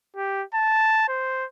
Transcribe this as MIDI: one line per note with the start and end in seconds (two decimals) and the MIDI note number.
0.16 0.44 67
0.54 1.08 81
1.08 1.46 72